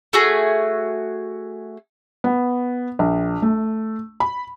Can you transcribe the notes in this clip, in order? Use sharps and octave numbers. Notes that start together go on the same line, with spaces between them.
A3 F#4 G#4
B3
A#1
A3
B5